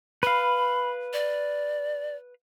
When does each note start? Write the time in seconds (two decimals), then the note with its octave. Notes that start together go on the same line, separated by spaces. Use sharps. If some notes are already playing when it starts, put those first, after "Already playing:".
0.23 B4 F5 B5
1.13 D5